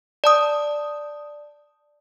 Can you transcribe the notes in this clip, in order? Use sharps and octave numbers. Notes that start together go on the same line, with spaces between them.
D5 A5 D#6